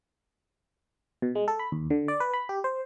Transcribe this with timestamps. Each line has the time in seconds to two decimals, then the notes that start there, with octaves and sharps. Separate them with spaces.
1.22 B2
1.35 G#3
1.48 A4
1.59 B5
1.72 D#2
1.90 D3
2.08 D5
2.20 B4
2.34 B5
2.49 G4
2.64 C5